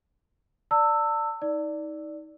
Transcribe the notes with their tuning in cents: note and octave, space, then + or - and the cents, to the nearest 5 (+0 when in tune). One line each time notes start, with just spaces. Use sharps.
D5 +0 A5 +40 E6 +0
D#4 +25 D5 +0